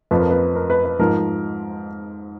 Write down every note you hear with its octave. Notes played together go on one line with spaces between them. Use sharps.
F2 F3 B4
A#4
B4
A#4
B4
B4
G#2 F3 A#4